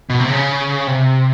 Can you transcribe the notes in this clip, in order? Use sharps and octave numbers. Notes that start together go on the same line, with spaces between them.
B2
C3
C#3
C3